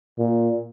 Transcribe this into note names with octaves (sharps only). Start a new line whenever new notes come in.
A#2